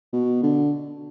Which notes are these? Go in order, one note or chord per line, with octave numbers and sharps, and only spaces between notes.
B2
D3